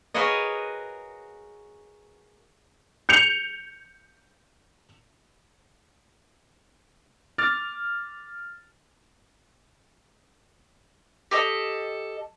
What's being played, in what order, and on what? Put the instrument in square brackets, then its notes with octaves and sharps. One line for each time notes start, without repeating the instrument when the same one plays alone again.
[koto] F#4 G#4 A#4 B4 C#5 D#5
[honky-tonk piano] G6 C#7 F7
[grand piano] D6 F6 A6
[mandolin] G4 A4 D#5